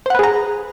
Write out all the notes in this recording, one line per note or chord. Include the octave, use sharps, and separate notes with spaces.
G#4 B4 C5 F#5 A#5